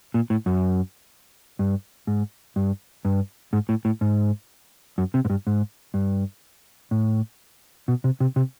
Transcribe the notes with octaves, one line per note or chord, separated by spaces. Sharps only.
A#2
A2
F#2
G2
G#2
G2
G2
G#2
A2
A2
G#2
F#2
C3
G#2
G2
G#2
G2
A2
B2
C3
C3
C3